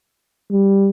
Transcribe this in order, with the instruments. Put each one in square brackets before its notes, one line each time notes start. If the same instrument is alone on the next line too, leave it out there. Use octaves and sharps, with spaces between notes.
[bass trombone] G3